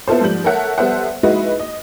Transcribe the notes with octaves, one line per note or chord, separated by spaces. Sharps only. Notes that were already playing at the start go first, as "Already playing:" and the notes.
B3 E4 F4 A4 C5
G#2 F3 G3 G6 F#7
A4 A#4 C#5 E5 F#5
G3 B3 A4 C5 E5 F#5
G#3 D#4 E4 F#4 B4
D#5